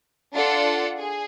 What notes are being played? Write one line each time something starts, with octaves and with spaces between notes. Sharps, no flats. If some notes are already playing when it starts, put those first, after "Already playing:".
D4 F4 A4 D5 F#5
G#4